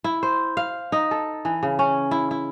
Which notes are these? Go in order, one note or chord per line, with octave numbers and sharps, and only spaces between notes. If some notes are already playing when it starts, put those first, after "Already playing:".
E4
C5
F5
D#4
A4
E3
C#3
C#4
E4
E4